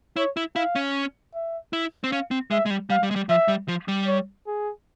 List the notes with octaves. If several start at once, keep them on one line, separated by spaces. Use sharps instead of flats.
E4 C#5
E4
E4 F5
C#4
E5
E4
C4
C#4 F5
C4
G#3 E5
G#3
G3
G3 F5
G3
G#3
G3
F3 E5
G3
F3
G3
C#5
G#4